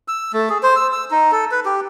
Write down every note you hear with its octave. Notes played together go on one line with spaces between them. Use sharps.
E6
A3
G#4
C5
E6
E6
D#4
A4
B4
G4